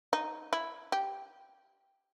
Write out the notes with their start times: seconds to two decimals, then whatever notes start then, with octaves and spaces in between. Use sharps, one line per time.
0.13 D#4
0.53 E4
0.92 G4